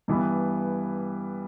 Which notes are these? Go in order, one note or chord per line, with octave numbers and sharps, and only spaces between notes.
G2 E3 B3